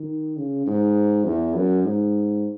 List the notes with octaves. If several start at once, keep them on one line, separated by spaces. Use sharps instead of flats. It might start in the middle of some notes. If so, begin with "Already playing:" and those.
Already playing: D#3
C#3
G#2
E2
F#2
G#2